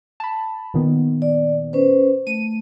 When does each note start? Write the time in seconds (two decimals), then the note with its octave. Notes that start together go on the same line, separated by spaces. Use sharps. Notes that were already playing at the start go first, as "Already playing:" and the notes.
0.20 A5 B5
0.74 A#2 D#3 B3
1.22 D5
1.73 C#4 B4 C5
2.27 A3 D#7